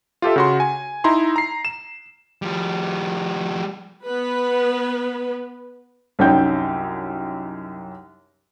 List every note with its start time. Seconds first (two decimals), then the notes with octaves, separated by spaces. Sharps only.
0.22 F4 G4 A4 E5
0.36 C#3 F#4 C6
0.60 G#5
1.04 D#4 E4 A#5 C6
1.36 A#5 C7
1.65 E7
2.42 F3 G3
4.04 B3 B4
6.19 C2 F#2 C#4 D#4 G5 G6